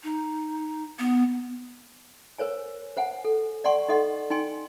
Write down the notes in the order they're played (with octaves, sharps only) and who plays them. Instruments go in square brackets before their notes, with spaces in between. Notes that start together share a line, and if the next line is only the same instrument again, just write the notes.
[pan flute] D#4
B3
[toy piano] A#4 C5 C#5 G#5
C5 F#5 G#5
A4
D5 F#5 G#5 C6 C#6
D#4 A4 D#5 F#5 C6
D#4 G5 G#5 C6